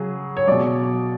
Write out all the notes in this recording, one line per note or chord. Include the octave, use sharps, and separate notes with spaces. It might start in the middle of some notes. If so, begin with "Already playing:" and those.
Already playing: C#3 F#3 G#4
C#5
B2 F#3 D5